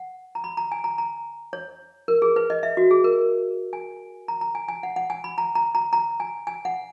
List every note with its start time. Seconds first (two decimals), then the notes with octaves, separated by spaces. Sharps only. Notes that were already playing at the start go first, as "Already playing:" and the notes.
Already playing: F#5
0.35 A#5
0.44 B5
0.57 A#5
0.72 G#5
0.84 A#5
0.98 A#5
1.53 C#5
2.08 A#4
2.22 G#4
2.36 B4
2.50 D#5
2.63 E5
2.77 F#4
2.91 G#4
3.04 A#4
3.73 G#5
4.28 A#5
4.41 A#5
4.55 G#5
4.68 G#5
4.83 F#5
4.96 F#5
5.10 G#5
5.24 B5
5.38 A#5
5.55 A#5
5.75 A#5
5.93 A#5
6.20 G#5
6.47 G#5
6.65 F#5